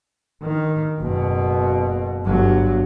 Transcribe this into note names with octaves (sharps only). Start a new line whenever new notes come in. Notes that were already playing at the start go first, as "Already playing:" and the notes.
D#3
F#1 B2
G1 F#3